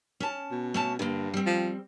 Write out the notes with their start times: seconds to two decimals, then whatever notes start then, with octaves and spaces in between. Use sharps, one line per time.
0.20 C#4 A5
0.51 B2
0.74 A3 C#4 A5
0.99 G2 D3 A#3
1.34 G3 C4
1.46 F3